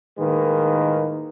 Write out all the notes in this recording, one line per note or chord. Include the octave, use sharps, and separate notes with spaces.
A2 D#3 G#3 A#3 B4